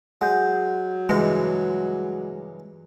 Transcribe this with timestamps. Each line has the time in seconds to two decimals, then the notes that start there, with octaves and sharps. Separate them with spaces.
0.21 F#3 G#3 F#5 G6
1.09 C#2 G2 E3 G#3